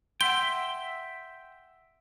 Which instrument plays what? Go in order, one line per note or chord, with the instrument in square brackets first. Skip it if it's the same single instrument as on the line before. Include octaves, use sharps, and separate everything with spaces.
[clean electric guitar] E5 G5 [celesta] F#5 C6 [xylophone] G7